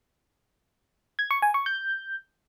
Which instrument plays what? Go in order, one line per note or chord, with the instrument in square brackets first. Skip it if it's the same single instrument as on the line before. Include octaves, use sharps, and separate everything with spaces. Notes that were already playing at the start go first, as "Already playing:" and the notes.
[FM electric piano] G#6
C#6
G#5
C#6
G6